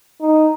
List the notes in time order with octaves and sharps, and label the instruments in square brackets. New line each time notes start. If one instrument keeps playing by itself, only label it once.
[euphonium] D#4